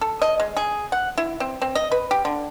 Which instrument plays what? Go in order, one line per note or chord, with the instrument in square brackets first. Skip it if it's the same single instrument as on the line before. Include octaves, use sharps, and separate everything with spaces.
[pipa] A4
D#5
G#3
G#4
F#5
E4
C4
C4
D#5
B4
G4
D3